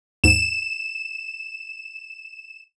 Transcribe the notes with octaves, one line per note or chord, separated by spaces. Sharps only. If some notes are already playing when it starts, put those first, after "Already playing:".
D#2 G#2 E7